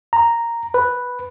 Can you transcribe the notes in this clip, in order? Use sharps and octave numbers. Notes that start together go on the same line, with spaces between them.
A#5
B4